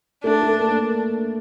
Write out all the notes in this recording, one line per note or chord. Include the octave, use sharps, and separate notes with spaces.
A3 D4
A3
A#3